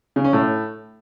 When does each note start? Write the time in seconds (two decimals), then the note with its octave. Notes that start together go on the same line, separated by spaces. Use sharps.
0.16 C#3
0.25 C#4
0.33 A2